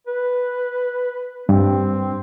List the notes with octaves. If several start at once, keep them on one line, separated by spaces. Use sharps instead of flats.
B4
G2 C4